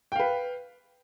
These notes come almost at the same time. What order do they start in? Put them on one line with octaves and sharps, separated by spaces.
G5 F5 B4